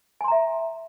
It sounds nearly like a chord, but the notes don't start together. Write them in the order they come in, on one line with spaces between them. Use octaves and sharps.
G#5 C6 A#5 E5